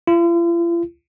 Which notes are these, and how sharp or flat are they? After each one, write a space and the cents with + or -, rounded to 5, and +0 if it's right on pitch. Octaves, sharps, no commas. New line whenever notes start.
F4 -45